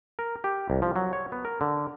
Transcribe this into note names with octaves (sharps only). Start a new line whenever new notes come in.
A#4
G4
C2
F3
F#3
C#5
B3
A#4
D3